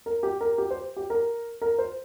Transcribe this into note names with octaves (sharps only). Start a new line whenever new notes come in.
A#4
G4
A#4
G4
C5
G4
A#4
A#4
C5